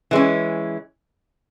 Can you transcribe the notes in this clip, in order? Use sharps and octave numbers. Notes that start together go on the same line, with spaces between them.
E3 G#3 C#4